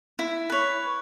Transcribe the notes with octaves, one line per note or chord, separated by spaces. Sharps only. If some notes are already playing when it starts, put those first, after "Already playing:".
E4
B4 C#5